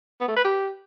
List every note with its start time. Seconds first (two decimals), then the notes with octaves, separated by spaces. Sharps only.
0.20 B3
0.28 A3
0.36 B4
0.44 G4